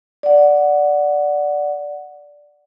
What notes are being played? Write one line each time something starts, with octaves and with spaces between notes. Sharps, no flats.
D5 F#5